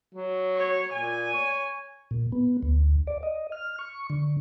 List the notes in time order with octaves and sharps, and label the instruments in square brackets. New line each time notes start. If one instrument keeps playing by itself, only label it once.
[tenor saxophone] F#3
[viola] C#5
[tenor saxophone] A#2 [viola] G#5
[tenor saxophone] C#5
[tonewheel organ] A#2
B3
D2
D5
D#5
F6
C#6
D3